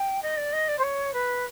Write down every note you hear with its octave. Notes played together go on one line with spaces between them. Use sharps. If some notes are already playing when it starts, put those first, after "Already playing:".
Already playing: G5
D#5
D5
D#5
D5
C5
C#5
B4